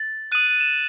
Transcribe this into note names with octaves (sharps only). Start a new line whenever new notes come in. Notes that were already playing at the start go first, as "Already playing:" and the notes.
Already playing: A6
D#6 F#6 D#7
D#7
E7